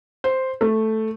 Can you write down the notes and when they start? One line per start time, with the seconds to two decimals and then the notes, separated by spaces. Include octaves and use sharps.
0.24 C5
0.61 A3